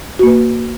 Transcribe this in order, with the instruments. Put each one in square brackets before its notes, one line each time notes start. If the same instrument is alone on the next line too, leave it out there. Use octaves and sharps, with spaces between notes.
[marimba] F#4
A#3
B4